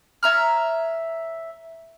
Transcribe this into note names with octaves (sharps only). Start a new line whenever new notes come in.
C#5 E5 A#5 F6